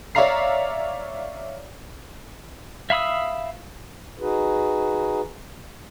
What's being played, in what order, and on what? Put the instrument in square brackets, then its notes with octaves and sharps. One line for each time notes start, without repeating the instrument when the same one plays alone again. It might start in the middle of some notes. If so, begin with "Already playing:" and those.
[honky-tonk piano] C#5 D5 E5 F5 A#5 C7
[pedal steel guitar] E5 F5 B5 D#6 E6
[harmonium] D#4 F#4 G#4 B4